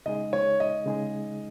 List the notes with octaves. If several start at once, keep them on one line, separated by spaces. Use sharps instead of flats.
C#3 G#3 D#4 G#4 D#5
C#5
D#5
C#3 G#3 D#4 G#4